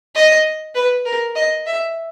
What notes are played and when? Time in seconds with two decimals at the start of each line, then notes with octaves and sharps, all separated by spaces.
0.15 D#5
0.75 B4
1.05 A#4
1.35 D#5
1.66 E5